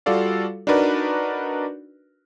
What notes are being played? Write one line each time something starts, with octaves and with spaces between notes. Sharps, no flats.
G3 F4 F#4 A4 D5 F5
D4 D#4 F#4 A#4 B4 D5